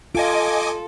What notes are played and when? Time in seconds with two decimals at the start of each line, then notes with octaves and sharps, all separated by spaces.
0.15 F4 A4 D#5 G#5 D6